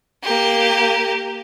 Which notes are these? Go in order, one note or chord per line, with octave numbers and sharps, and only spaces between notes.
A#3 G4